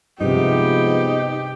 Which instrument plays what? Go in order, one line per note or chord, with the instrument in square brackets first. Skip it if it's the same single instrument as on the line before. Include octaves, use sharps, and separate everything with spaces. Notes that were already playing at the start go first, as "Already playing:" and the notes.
[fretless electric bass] G2 C3 [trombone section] F3 G#3 B3 [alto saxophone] D#4 [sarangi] G4